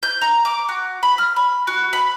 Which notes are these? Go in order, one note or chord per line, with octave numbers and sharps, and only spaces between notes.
G6
A#5
D6
F#4
B5
F6
B5
F#4
B5